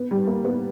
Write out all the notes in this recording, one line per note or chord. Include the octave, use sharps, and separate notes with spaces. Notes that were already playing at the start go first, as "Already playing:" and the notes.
Already playing: B3
G3
A#3
B3